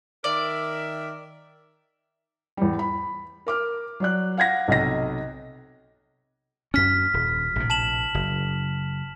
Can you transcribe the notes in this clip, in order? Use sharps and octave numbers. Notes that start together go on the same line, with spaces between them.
D#3 A#4 D5 E5
E2 G3
B5
A#4 D6 F6
F#3 D5 F#6
F5 F#5 G#6 A#6
B1 C3 D#5 A#6
F#2 C#4 F6 B6
D#1
A#1 A2 C3
A5 E7 F#7
F#1